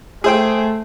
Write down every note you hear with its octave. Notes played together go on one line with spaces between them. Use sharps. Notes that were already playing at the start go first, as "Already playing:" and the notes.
A3 G#4 C5 G5